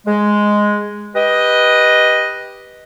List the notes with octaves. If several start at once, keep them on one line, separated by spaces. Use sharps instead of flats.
G#3
G4 B4 D#5